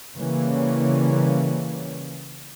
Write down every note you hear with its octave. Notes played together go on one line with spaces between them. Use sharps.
C#3 E3 G3 A#3 C#4